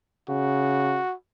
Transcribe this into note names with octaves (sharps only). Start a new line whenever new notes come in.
C#3 F#4